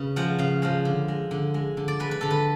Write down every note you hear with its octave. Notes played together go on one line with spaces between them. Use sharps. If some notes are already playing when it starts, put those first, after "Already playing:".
Already playing: C#3 B4
F3 G#3 F#5
C#3 F5
F3 G#3 F5
D3
G#3
D3
G#3
D3
D5
G#3 B4
B4
D3 A4
B4